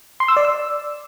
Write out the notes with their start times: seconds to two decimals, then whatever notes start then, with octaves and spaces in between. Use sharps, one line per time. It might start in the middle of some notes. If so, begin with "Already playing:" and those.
0.20 C6
0.28 E6
0.37 D5
0.45 E6